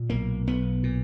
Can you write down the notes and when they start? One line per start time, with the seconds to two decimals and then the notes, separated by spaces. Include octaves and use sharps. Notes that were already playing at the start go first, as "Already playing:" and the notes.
Already playing: A#2
0.10 B1 A#3
0.47 B1 B3
0.83 A#2